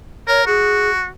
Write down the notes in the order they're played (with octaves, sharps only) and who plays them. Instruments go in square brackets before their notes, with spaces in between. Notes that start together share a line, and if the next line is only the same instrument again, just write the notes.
[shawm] A#4 [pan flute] C#5
[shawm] F#4 [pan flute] G#4